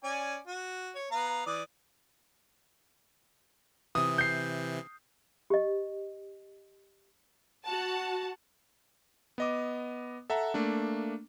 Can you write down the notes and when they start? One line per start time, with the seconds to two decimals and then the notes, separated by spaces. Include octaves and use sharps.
0.04 C#4 D5 G#5
0.47 F#4
0.95 C#5
1.11 B3 F5 A#5
1.46 E3 D5 D#6
3.95 C3 E3 D#6
4.18 G6 C7
5.50 G4 D#5
7.65 F#4 F#5 A5
9.38 B3 D#5 D6
10.30 A4 E5 F#5 A#5
10.54 A3 A#3 D4